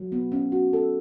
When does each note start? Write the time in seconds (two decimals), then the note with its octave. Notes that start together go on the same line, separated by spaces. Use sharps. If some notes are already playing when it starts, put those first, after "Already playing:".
Already playing: F#3
0.12 B3
0.32 C#4
0.52 F#4
0.73 A4